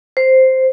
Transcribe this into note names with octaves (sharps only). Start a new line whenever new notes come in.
C5